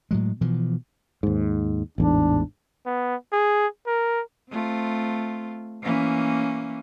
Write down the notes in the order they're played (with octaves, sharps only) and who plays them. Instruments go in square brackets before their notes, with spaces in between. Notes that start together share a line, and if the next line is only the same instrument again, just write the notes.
[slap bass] A2 F#3 G#3
B2 E3 F3
[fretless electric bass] D#2 G#2
[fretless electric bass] A1 E2 G#2 [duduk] D4
[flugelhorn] B3
G#4
A#4
[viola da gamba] A3 C4 F4
E3 A#3 C#4